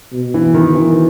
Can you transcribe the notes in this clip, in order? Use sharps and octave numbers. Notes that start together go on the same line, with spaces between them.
B2
E3
D#3
E3